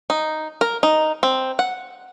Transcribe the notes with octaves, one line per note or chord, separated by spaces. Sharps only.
D#4
A#4
D#4
C4
F#5